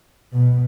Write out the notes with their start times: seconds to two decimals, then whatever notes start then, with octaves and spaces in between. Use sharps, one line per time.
0.32 B2